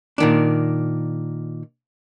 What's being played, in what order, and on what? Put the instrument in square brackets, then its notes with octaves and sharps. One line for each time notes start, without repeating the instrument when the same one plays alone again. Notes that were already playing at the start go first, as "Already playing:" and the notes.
[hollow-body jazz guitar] A#2 D#3 D4